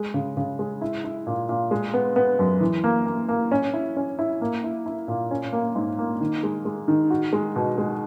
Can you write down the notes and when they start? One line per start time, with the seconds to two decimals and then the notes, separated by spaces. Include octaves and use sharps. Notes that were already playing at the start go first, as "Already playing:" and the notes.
Already playing: G#3
0.14 C#3
0.37 C#3
0.59 G#3
0.81 E4
1.04 E4
1.27 A#2
1.49 A#2
1.71 G#3
1.94 B3
2.16 B3
2.39 F#2
2.61 E3
2.84 A#3
3.06 A#3
3.29 A#3
3.51 C#4
3.73 E4
3.97 C#4
4.19 E4
4.41 A#3
4.64 E4
4.86 E4
5.08 A#2
5.31 C#4
5.53 A#3
5.75 G#2
5.98 A#3
6.20 D#3
6.43 G#3
6.65 G#3
6.88 D#3
7.10 F#4
7.33 G#3
7.56 B2
7.78 G#3